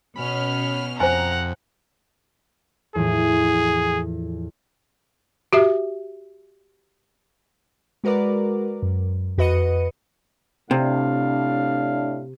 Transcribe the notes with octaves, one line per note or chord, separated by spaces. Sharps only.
B2 C#4 B5 F6
F2 C5 F#5 G#5 A#5
E2 A2 F3 G#4
F#4 G4 E5
G#3 F#4 A#4 B4 D5
F#2
F2 F#4 B4 D#5 C#7 D#7
A2 C3 D4 F5